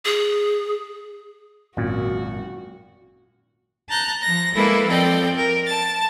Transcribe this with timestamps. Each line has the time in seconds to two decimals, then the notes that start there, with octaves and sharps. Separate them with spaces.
0.05 G#4
1.77 G#1 F#2 A#2 F#4
3.89 A5 A#5 F#6 G6
4.23 F3 A#6
4.55 G#3 A#3 E4 A4 B4
4.88 F3 C4 A4 D5 D#5 G5
5.36 A#4
5.66 A5 A6